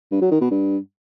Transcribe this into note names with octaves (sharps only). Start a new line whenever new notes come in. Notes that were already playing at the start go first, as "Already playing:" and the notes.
G2
F#3
D#3
B2
G2